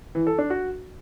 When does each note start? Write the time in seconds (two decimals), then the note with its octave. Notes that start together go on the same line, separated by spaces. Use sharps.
0.15 E3
0.27 A4
0.38 D4
0.50 F#4